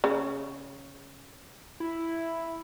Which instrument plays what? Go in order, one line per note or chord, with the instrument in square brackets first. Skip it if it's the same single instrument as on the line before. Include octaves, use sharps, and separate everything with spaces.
[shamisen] C#3
[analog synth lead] E4